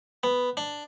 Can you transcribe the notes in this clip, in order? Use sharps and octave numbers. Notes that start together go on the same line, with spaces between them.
B3
D4